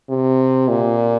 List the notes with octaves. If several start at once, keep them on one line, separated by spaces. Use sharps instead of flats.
C3
A#2